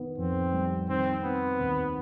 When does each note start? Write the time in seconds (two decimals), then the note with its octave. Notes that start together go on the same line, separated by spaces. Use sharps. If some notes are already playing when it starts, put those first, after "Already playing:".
Already playing: D#3 B3
0.18 F2 C4
0.53 G3
0.89 D#3 C4
1.24 B3 C4
1.60 D#2